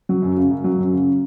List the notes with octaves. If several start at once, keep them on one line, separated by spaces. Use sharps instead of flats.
F#3
F#2
C#3
F#2
F#3
F#2
C#3